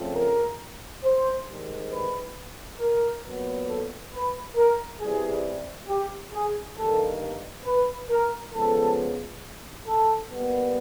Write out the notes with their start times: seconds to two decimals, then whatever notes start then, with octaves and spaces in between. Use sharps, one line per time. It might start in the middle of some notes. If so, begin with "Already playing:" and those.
Already playing: C#3 F3 A3 C4
0.14 A#4
1.03 C5
1.47 G#2 D#3 G3
1.91 B4
2.80 A#4
3.23 A#2 F#3 B3
3.68 A4
4.13 B4
4.55 A#4
5.00 C3 E3 G3 G#4
5.88 G4
6.32 G#4
6.77 G2 D#3 G3 A#3 A4
7.65 B4
8.10 A#4
8.52 C#3 F3 G#3 B3 A4
9.86 A4
10.29 A#2 G3 B3